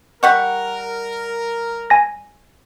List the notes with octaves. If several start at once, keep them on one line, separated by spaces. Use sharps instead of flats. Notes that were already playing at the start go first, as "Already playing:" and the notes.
G3 A#4 F#5 C#6
G#5 A#6